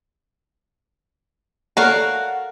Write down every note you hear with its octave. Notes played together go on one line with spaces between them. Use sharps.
F#4 A4 A#4 C#5 D5 F5 A5